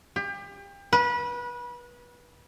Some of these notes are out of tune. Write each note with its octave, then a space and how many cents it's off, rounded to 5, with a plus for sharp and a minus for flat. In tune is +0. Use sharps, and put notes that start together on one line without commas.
G4 +30
B4 -25